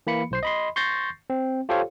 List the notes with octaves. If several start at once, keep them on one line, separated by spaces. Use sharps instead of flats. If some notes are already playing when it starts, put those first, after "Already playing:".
E3 A#3 B5 C#7
B1 C5 C7
D#5 B5 C6
C6 C#6 G6 A6 A#6 C7
C4
F4 G4 A4 C5 C#5 F5